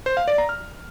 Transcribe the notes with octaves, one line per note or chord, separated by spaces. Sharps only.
C5
F5
D5
A#5
F6